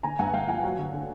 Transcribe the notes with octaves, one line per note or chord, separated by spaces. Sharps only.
D3 G#5 A#5
G2 F#5 G#5
G2 F5 G5
F3 F#5 G#5
F#3
D3
D3